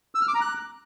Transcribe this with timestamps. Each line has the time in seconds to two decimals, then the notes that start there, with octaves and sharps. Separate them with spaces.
0.15 E6
0.21 F6
0.28 D6
0.35 A#5
0.41 F#6